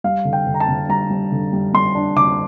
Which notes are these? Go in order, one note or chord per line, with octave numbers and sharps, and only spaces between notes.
G3 F5
D3
G5
D3
A#5
A5
D3
G3 A#5
G3
D3
G3
G3 C6
D4
D3 D6